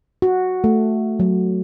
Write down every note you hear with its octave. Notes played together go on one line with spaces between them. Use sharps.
F#4
A3
F#3